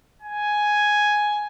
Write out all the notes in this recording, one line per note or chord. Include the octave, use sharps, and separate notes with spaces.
G#5